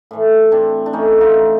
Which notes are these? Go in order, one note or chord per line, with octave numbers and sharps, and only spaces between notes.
A2 E3 A3
C4 D4
D4
A2 E3 A3 C#4 D#4
D#4 F4